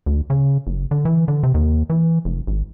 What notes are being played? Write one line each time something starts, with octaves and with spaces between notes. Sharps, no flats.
D2
C#3
F#1
D3
E3
D3
C3
D#2
E3
F1
G#1